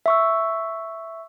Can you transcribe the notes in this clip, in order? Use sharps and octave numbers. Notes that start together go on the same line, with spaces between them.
E5 C#6 E6